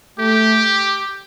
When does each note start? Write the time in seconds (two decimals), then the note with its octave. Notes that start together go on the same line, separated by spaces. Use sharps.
0.19 A3 G4